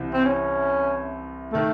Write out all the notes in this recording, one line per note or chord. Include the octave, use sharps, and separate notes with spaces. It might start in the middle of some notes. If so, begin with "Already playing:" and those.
Already playing: C2 C3 E3
C4
C#4
D#3 A3